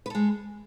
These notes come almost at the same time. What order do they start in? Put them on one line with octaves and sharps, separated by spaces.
B4 A4 G#3